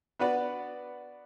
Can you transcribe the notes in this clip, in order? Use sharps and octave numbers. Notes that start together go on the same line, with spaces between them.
B3 D4 F#4 B4 D5